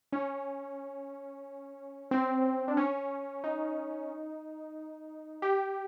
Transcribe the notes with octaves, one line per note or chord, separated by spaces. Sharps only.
C#4
C4
D4
C#4
D#4
G4